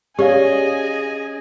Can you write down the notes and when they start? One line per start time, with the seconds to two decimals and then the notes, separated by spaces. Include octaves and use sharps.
0.19 C#4 G4 G#4 D5 D#5 F5 G#5